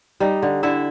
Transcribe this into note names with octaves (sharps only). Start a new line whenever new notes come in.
G3 D#4 D#5
D3
D3 E4 E5